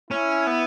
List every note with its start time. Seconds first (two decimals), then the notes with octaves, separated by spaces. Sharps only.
0.11 C#4 E4
0.47 B3